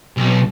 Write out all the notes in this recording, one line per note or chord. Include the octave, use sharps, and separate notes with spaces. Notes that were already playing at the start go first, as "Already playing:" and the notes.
B1